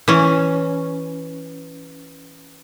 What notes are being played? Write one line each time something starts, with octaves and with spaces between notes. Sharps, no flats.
E3 C#4